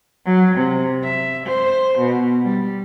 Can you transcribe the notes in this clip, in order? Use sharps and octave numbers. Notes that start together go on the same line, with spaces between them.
F#3
C3
E5
C5
B2
G3